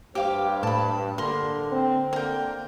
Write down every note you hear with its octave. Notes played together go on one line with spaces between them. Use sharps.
G2 G4 C5 F5 D6
A2 A5 B5
D3 A#3 A#4 C6
C4
D3 A#3 A#4 G5